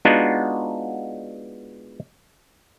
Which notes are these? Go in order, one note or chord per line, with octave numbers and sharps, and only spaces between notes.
G#3 B3 D4 D#4 F4 F#4